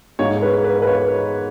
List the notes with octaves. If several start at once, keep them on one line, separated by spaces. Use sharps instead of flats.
G#2 G#3 C#5
B4
B4
B4
C#5